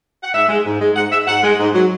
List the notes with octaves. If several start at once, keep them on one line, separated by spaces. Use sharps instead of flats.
F#5
G#2 E5
G#3
G#2
G#3
G#2 F#5
G#3 E5
G#2 F#5
G#3
G#2
F#3